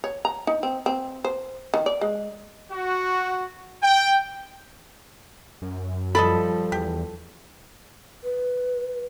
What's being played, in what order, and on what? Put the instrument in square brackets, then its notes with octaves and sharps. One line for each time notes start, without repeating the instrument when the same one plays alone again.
[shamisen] C#5
A#5
D#4
C4
C4
C5
D#3
D5
G#3
[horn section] F#4
G5
[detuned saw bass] F#2
[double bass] F3 G3 [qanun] A4 [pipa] D#5 A5 B5
[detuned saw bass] E2 [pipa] G4
[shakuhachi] B4